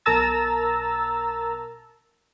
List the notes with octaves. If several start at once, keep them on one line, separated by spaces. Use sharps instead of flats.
B1 A#4 A5 A#5 E6 A6